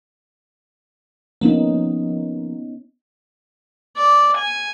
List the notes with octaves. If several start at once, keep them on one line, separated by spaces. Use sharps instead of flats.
F3 A#3 B3 C#4 D#4
D5
G#5